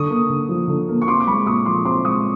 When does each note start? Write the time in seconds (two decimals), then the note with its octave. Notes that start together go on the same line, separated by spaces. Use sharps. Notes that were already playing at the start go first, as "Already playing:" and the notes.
Already playing: D3 C#6 D#6
0.10 A#3
0.30 D3
0.49 F3
0.68 D3
0.88 A#3
1.02 C#6
1.07 C4 C6 D6
1.20 D6
1.27 G#3 B5 C#6
1.46 A#2 C#6 D#6
1.65 F3 C6 D6
1.85 C4 C6 D6
2.05 G#3 C#6 D#6